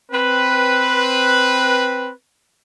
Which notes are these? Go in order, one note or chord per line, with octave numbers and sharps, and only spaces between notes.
C4 B4